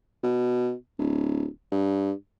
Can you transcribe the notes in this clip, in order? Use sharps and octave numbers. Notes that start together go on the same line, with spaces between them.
B2
D1
G2